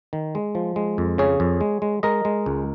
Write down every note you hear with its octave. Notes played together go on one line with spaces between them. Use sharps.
D#3
G#3
F3
G#3
F2
C#3 G#4 C#5
F2
G#3
G#3
G#3 A#4 D#5
G#3
C#2